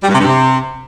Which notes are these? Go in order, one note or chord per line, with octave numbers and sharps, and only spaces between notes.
G3
G2
C3
G2
C3